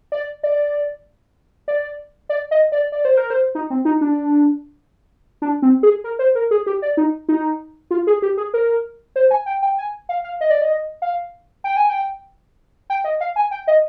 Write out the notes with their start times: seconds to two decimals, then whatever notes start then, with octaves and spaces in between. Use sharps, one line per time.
0.12 D5
0.43 D5
1.68 D5
2.29 D5
2.51 D#5
2.72 D5
2.92 D5
3.05 C5
3.17 A#4
3.30 C5
3.55 D#4
3.70 C4
3.85 D#4
4.01 D4
5.42 D4
5.62 C4
5.83 G#4
6.04 A#4
6.19 C5
6.35 A#4
6.51 G#4
6.66 G4
6.82 D5
6.97 D#4
7.29 D#4
7.91 F4
8.07 G#4
8.22 G4
8.37 G#4
8.54 A#4
9.16 C5
9.31 G#5
9.46 G5
9.63 G5
9.78 G#5
10.09 F5
10.24 F5
10.41 D#5
10.50 D5
10.61 D#5
11.02 F5
11.64 G5
11.76 G#5
11.89 G5
12.90 G5
13.04 D#5
13.20 F5
13.36 G#5
13.51 G5
13.68 D#5